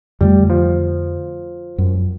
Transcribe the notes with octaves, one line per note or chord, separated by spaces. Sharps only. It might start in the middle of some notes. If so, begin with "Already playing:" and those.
F2 D3 G3 A3
F3
F#2